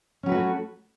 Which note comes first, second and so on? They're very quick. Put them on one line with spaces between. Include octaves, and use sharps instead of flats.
C#4 F#3 B4 F#4 A3